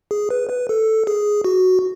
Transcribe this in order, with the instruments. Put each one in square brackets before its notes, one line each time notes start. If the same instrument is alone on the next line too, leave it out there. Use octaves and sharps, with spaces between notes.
[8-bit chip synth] G#4
B4
B4
A4
G#4
F#4